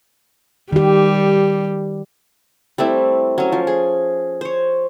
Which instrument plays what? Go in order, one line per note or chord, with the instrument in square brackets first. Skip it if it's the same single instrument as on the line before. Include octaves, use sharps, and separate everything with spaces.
[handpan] D#3 G4 [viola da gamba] G3
[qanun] G3 A3 C4 E4
F#3 C#4
F3
G#4
C5 C#5